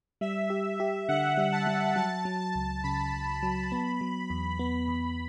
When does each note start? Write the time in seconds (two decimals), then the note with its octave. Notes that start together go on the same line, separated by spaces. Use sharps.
0.21 G3 E5
0.50 G4
0.80 G4
1.09 D3 F#5
1.37 G3
1.52 A5
1.67 G3
1.96 F#3 A5
2.25 F#3
2.40 A5
2.55 C#2
2.83 C#3 B5
3.13 C#2
3.43 F#3
3.72 B3
4.01 F#3
4.30 E2
4.59 B3 B5
4.88 E2